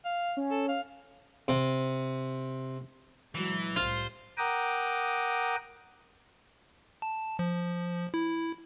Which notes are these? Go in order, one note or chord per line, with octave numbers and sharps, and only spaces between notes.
F5
C#4
A4
F5
C3
A#2 E3 F#3 G#3
C2 A2 G3 F4 C5
A#4 F#5 G5 A#5 D6 D#6
A5
F3
E4